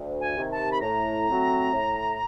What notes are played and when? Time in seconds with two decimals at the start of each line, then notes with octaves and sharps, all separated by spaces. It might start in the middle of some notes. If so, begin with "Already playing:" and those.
Already playing: D2
0.21 G#5
0.36 C3 D#3
0.51 A5
0.71 B5
0.81 A2 A#5
1.27 F#3 A3 C4
1.73 A2